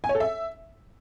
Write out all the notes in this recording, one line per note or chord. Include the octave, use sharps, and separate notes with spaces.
G#5
C#5
A4
E5